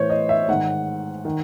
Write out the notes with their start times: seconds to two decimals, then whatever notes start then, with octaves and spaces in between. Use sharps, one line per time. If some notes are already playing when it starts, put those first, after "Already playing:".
Already playing: A2 E3 C5 C#5
0.10 D#5
0.29 E5
0.48 G#2 D#3 F#5
1.25 D#3